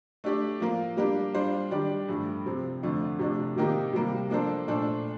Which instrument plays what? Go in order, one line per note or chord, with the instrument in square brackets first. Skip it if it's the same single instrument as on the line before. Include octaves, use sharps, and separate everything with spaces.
[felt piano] A3 D4 G4 D5
F3 A#3 F4
G3 A#3 D4 G4
G3 D4 F4 C5
D#3 G3 D4 G4 D5
G2 F3 A3
C3 F3 C4
F2 D3 F3 A3
C3 F3 A3 D4
C3 D#3 A#3 D#4 G4
C3 G3 A#3
F3 A#3 D4 A4 C5
A#2 A3 D4 A4 C5